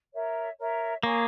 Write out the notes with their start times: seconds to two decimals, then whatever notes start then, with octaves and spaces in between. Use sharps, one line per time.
0.13 A#4 C#5 E5
0.59 A#4 C#5 E5
1.03 A#3 G#4 C#5 G#5 C#6